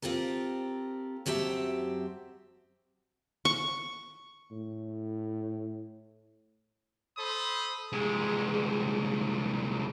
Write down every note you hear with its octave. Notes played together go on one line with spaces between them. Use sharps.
C4 F4 G4 A4 A#4
F#2 F#3 C4 G4 E5 A5
C#6
A2
A4 C5 B5 D#6
C2 G#3